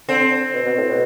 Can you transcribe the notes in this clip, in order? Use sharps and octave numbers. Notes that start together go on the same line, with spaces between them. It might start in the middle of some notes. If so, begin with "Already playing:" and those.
D3 C4
B2
B2
A2
B2